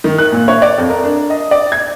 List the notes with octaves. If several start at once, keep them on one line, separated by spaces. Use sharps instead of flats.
D#3
F#6
A#2
C#5
D5
F2
A#4
D4
D#5
D5
G#6